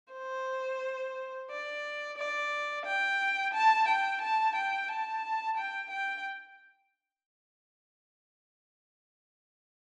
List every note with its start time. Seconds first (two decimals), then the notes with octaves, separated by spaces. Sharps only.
0.14 C5
1.50 D5
2.17 D5
2.86 G5
3.53 A5
3.88 G5
4.21 A5
4.56 G5
4.88 A5
5.57 G5
5.91 G5